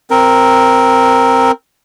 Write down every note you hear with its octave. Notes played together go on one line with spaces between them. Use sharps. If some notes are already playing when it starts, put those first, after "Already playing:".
C4 A#4